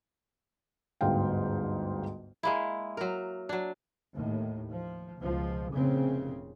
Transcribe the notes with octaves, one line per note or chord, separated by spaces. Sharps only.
G1 D2 G#2 F5 G5
G#3 A#3 E4
F#3 A#4
F#3 D4
D#2 A2
F3
C#2 B2 F3
F1 A#2 C#3 C4